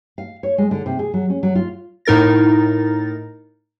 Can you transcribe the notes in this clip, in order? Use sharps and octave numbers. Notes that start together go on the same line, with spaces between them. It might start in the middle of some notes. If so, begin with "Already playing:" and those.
F5
C#5
G#3
D3
C3
G#4
F#3
C#4
F#3
F4
A2 D#4 A#4 A6 A#6